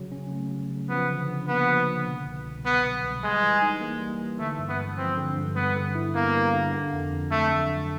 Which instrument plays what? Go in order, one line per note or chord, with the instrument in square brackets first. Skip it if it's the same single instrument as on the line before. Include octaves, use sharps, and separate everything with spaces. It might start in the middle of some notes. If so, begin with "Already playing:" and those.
Already playing: [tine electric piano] C#3 F#3
C#4
A3
F#3
C#3
[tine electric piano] F3 [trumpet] B3
[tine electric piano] D3
D4
[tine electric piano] A#3 [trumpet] B3
[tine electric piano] F3
D3
B2
C2
C2
[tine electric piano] F#3 [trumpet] B3
[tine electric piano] B2
C2
[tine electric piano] G3 [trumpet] G#3
[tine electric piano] E3
D#4
A#3
G3
E3
[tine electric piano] D3 [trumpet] A3
[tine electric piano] G2
[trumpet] B3
[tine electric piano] G#3
[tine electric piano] F3 [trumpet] C4
[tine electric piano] D3
G2
[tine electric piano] G3 [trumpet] B3
[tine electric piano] D3
E4
[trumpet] A#3 [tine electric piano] B3
[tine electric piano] G3
D3
D3
F2
F2
[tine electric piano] F#3 [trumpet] A3
[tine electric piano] D3
F2